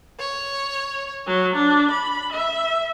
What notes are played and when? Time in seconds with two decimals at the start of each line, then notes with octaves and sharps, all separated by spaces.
0.19 C#5
1.26 F#3
1.56 D4
1.90 B5
2.32 E5